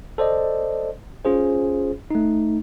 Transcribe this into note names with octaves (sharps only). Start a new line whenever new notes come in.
A4 C5 D5 D#5
C#4 F4 G#4 C5
A3 D#4